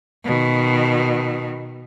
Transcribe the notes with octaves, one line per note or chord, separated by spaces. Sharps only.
B2 D#3